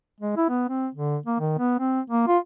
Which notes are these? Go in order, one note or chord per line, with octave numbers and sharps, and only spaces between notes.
G#3
E4
B3
C4
D3
A#3
D#3
B3
C4
A#3
F4